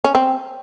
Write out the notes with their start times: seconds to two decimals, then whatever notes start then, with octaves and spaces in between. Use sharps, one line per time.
0.04 C#4
0.15 C4